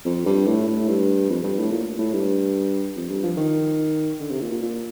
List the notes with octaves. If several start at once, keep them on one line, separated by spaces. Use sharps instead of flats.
F2
G2
A2
A2
G2
F2
G2
A2
A#2
A2
G2
F2
G2
F3
D#3
D3
C3
A#2
A#2
A#2